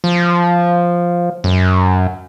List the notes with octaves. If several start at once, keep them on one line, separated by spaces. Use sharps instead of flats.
F3
F#2